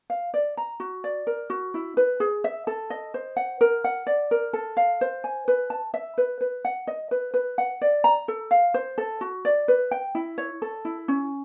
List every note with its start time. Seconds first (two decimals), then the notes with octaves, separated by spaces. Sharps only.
0.10 F5
0.34 D5
0.57 A#5
0.80 F#4
1.04 D5
1.27 A#4
1.50 F#4
1.74 E4
1.97 B4
2.20 G#4
2.44 E5
2.67 A4
2.90 D#5
3.14 C5
3.37 F#5
3.61 A#4
3.84 F#5
4.07 D5
4.31 A#4
4.53 A4
4.77 F5
5.01 C5
5.24 G#5
5.48 B4
5.70 A5
5.94 E5
6.18 B4
6.41 B4
6.65 F#5
6.87 D#5
7.11 B4
7.34 B4
7.58 F#5
7.82 D5
8.04 A#5
8.28 A4
8.51 F5
8.74 C5
8.98 A4
9.21 F#4
9.45 D5
9.68 B4
9.91 G5
10.15 E4
10.38 C#5
10.62 A4
10.85 E4
11.08 C#4